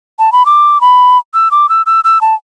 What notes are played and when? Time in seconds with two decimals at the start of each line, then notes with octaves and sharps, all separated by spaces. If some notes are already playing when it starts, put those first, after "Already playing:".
0.19 A5
0.32 B5
0.46 D6
0.81 B5
1.34 E6
1.51 D6
1.69 E6
1.86 E6
2.04 E6
2.21 A5